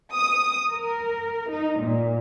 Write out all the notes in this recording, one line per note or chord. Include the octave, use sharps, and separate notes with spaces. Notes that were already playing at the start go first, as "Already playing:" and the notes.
D#6
A#4
D#4
A#2